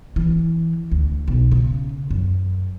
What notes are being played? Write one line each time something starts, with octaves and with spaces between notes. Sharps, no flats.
E3
D2
B1
C#3
F#2